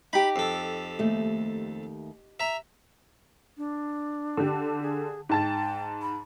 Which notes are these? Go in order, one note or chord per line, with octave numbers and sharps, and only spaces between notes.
D#4 G4 B5
F2 A4
D#2 A3
E5 A#5
D4
D3 G4
G#4
G#2 G5 A5 A6
B5